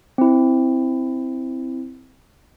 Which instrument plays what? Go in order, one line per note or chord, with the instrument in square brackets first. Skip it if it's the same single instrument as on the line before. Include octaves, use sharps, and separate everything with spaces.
[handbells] C4 E4